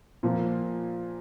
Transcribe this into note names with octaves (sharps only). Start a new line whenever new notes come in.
A#2 F3 A#3